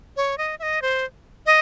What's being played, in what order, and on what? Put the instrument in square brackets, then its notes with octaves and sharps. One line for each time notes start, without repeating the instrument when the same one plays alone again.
[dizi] C#5
D#5
E5
D#5
C5
D#5